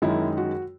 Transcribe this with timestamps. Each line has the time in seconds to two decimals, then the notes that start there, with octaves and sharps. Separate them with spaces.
0.02 F#2 D#3 G#3 D#4 E4
0.37 F#4